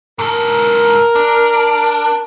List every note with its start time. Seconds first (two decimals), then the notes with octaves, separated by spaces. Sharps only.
0.19 G#2 A4 A#4
1.15 D4